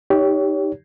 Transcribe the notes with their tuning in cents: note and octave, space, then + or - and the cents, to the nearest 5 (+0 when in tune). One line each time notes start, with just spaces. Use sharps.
D#4 +0 G4 +0 C#5 +25